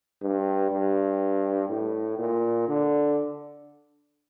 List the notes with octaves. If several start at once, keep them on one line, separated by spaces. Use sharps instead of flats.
G2
G2
A2
A#2
D3